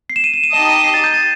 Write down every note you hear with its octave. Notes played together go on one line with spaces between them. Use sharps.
C7
E7
D#7
E7
D#7
D#4 G4 D#5 A5 E7
D#7
C7
A6
G6
A6